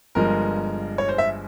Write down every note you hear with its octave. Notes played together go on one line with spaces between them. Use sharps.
G1 G2 F3 G#3 A#4
C#5
C5
E5